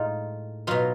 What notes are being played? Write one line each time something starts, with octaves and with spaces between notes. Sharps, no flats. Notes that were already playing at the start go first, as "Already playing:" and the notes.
Already playing: A2 G#3 D#4 F4
B2 F#3 D#4 F4